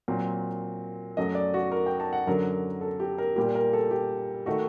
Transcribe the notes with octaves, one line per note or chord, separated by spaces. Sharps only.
A#2 F#3 C4
F#2 F#3 A3 D#5
D5
F#4
A#4
G5
A5
F#5
F#2 D3 F#3 A#4
A4
G4
A#4
A#2 G3 A#3 G4
A#4
A4
G4
D#3 A3 D#4 F#4